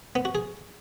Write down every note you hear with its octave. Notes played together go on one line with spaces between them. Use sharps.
B3
F#4
G#4